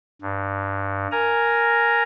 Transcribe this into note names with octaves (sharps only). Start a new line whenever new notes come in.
G2
A#4 G#5 A#5